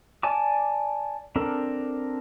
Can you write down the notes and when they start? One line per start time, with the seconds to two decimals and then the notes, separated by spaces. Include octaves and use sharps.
0.23 D5 G#5 A5 D6
1.36 C4 D4 A4 A#4